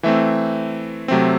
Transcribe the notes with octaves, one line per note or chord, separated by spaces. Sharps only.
E3 A3 C4 E5
C3 F#3 A3 C4